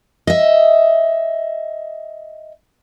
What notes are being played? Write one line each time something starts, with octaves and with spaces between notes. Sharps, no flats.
D#5 E5